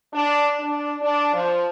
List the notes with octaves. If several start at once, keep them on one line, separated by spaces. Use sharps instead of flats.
D4
D4
D4
F3